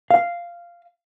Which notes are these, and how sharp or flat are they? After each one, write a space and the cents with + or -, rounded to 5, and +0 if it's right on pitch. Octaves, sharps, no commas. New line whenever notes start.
F5 -10